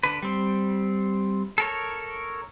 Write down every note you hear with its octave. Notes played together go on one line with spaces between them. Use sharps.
D3 B4
G3 C4
A4 A#4 C#5